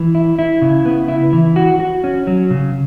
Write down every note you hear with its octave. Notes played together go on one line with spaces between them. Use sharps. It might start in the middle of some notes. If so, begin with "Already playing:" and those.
Already playing: E3
E4
E4
C#3
B3
E4
E3
F#4
F#4
C#4
F#3
C#3